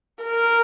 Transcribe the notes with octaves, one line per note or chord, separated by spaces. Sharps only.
A#4